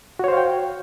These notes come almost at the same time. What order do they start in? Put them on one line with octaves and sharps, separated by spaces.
F#4 C#5 C5 F5 G5